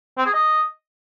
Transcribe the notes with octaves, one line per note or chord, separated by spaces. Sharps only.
C4
G#4
D#5